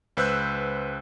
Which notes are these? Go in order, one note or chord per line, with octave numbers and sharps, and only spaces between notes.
C#2 B4 C5 E6 F#6 G6